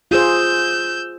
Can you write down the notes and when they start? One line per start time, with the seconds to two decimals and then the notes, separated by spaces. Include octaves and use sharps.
0.11 F4 G#4 C5 E6 G6